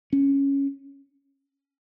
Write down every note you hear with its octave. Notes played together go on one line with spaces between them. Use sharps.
C#4